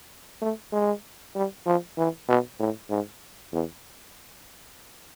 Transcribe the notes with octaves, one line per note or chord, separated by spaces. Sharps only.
A3
G#3
G3
F3
E3
B2
A2
G#2
E2